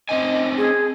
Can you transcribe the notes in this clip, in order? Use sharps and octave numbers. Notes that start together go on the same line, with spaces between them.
C4 D4 D#5 G#5
G#4